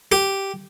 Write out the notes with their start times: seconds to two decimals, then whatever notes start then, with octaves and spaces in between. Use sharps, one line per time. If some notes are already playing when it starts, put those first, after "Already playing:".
0.12 G4